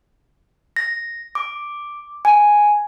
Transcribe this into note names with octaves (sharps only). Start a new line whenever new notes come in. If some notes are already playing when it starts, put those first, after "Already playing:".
A#6
D6
G#5